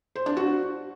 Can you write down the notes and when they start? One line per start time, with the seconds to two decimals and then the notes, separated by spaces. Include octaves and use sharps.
0.16 C5
0.26 D4
0.37 F#4